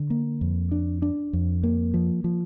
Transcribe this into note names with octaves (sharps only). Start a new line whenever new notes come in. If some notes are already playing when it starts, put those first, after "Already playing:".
Already playing: D3
A#3
F2
D4
D4
F2
A#3
F3
F3